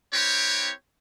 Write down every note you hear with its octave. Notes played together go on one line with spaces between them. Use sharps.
C4 E4 G4 B4 C#5